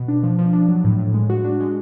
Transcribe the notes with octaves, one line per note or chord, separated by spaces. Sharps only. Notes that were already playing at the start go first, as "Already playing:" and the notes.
Already playing: B2
D4
F3
F3
D4
F#3
A2
A2
G#3
F#4
D4
G#3